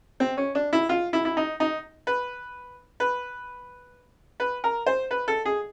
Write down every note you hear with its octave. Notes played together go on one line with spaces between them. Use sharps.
C4
C#4
D4
E4
F4
E4
E4
D#4
D#4
B4
B4
B4
A#4
C5
B4
A4
G#4